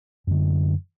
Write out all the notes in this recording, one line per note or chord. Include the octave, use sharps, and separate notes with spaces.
F#2 D3